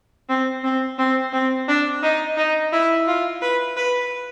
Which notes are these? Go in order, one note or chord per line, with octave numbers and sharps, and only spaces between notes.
C4
C4
C4
C4
D4
D#4
D#4
E4
F4
B4
B4